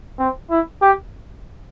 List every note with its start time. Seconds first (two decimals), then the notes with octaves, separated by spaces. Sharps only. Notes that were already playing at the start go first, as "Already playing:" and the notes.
0.19 C4
0.50 E4
0.82 G4